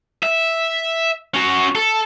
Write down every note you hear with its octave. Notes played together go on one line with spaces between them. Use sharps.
E5
C#4 F#4
A4